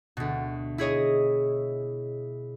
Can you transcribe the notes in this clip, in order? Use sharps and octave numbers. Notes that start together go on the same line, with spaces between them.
D2 B2
E4 G#4 C#5 D#5